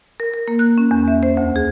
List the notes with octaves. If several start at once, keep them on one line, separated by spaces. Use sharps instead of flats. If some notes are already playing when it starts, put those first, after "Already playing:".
A#4
A#4
A#3
F#6
C#4
E2
E5
C5
D2
G#4